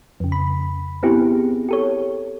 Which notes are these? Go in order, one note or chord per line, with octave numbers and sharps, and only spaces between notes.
F2 C#3
B5
B3 C4 E4 G4 G#4
G4 A4 C#5